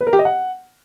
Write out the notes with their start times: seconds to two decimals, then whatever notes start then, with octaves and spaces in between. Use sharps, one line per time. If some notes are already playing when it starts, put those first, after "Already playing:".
0.01 B4
0.07 A#4
0.13 G4
0.19 D#5
0.25 F#5